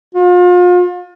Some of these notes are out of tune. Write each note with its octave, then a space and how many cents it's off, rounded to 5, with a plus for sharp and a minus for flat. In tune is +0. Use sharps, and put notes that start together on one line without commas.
F4 +35